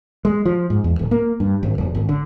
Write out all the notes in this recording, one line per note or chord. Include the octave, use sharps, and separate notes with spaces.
G#3
F3
G#2
E2
D1
A#3
G2
G#1
F1
G#1
D3